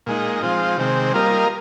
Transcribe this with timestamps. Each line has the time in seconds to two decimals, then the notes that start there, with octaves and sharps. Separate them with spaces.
0.06 A#2 G#3 D#4
0.42 F3 G#3 C4 F4
0.78 C3 D#3 G#3 C4
1.13 G3 A#3 F4 A#4 D#5